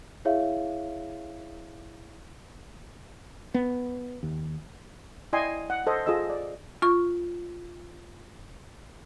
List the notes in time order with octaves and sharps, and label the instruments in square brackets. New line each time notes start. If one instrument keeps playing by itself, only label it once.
[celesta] E4 G#4 C#5 E5 F5
[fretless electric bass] B3
D#2
[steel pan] E4 D5 D#5 G5 G#5 C6
F#5
A4 C5 D#5
F4 G#4 A4 D#5 E6
D5
[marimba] F4 C#6